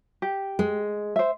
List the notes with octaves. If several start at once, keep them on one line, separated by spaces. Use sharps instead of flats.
G4
G#3
C5 E5